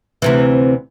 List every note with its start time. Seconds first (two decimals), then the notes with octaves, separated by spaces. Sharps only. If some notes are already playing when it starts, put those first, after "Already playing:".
0.22 D2 C3 E3